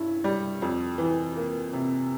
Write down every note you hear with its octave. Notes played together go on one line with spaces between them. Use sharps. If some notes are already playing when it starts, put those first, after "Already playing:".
Already playing: G2 C#4 E4
G3
F2
E3
A#3
C3